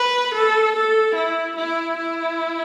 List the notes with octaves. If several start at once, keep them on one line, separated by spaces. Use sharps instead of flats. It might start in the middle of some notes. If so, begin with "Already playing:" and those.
Already playing: B4
A4
A4
E4
E4
E4